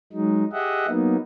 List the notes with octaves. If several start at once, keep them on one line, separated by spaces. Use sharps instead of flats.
F#3 G#3 D#4
G4 G#4 D#5 E5 F#5
F#3 A#3 B3 D#4